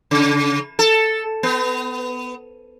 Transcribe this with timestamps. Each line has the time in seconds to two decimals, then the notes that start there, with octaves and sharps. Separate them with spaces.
0.11 C#3
0.79 A4
1.43 B3